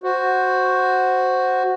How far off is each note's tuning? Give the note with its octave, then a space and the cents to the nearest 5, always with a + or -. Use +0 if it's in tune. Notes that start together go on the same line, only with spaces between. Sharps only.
F#4 +0 C5 +0